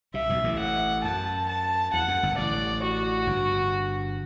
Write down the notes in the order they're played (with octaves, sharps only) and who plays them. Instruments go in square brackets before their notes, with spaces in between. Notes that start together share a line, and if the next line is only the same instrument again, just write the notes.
[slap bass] C2 C3 [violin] E5
[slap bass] B1 B2
A1 A2
[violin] F#5
[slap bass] F#2 [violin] A5
[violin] A5
[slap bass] E2 [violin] F#5
[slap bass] F#2
G1 G2
[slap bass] A1 A2 [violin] D5
[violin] F#4
[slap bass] G1 G2